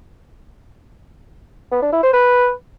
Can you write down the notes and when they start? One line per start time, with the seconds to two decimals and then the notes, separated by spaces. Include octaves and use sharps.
1.71 B3
1.82 D4
1.92 E4
2.03 C5
2.13 B4